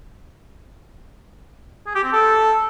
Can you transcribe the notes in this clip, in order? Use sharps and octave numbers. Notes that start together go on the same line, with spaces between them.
G#4
G4
C4
A4